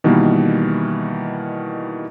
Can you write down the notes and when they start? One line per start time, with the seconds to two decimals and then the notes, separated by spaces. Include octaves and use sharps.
0.04 B2 D#3 E3 G3 A#3